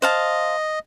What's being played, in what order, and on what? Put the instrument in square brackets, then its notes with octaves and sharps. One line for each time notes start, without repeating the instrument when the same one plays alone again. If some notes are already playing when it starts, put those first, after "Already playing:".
[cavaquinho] C5 F5 A5 [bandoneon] D#5